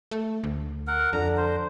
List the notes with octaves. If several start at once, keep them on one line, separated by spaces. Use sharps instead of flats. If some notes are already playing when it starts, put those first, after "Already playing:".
A3
D2
A#4 F#5
F2 D3 A#5
C5